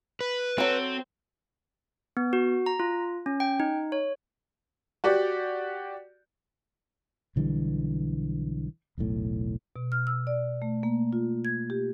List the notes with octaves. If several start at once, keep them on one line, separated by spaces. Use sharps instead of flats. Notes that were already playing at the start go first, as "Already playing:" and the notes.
B4
F#3 C4 A4
B3
F#4
A#5
F4
C#4
G5
D#4
C#5
F#4 G4 D5
B1 D3 E3 G3
E1 B1 A2
B2
F6
E6
D5
A3
A#3
F4
G#6
G4